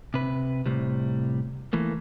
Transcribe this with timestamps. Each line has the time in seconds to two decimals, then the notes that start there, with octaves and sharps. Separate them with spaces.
0.14 C3 B4
0.66 A2 C3 G3
1.73 E3 A3 A#3